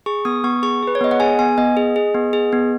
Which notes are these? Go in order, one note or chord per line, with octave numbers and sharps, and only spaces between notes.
G#4 C#6
B3 D#6
B3 C#6
G#4 C#6
G#4 B4
C#5
B3 D#5
F#5
G#4 G#5
B3 G#5
B3 D#5
G#4
G#4
B3
G#4
B3